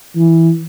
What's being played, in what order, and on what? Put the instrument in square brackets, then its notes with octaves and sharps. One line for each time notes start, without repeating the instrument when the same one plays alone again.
[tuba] E3